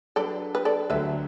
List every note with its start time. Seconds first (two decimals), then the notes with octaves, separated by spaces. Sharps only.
0.16 F#3 D4 A4 B4 D5
0.55 B4
0.65 A4 D5
0.90 D2 D3 F#3 B4 E5